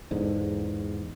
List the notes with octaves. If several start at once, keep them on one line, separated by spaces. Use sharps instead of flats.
E2 G#2 D3